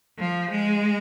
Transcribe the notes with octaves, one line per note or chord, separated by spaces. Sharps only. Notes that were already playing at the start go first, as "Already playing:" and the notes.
F3
G#3